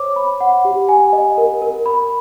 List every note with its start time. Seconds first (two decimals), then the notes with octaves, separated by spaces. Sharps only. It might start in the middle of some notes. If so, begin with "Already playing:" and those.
Already playing: C5 C#5 D6
0.16 B5
0.41 F#5
0.65 G4
0.89 G#5
1.13 D#5
1.38 A#4
1.62 A#4
1.86 B5